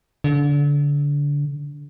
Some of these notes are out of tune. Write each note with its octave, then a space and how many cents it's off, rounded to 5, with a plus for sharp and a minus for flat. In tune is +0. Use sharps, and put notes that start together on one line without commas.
D3 -25